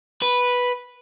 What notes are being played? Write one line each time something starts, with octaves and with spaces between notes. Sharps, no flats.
B4